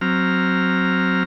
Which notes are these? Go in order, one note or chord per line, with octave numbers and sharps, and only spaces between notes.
F#3 C4 A#5 F6